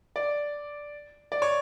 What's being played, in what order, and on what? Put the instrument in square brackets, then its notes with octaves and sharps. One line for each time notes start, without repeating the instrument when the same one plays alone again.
[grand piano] D5
D5
C#5